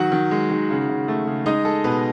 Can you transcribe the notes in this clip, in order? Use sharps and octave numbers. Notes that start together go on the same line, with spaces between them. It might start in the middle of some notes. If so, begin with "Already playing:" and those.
Already playing: D#3 F#3 F#4 F#5
D#3
G#3
D#3
C#3
C#3
A3
C#3
G#3 D#4 D#5
G#3 A4
B2 B3 B4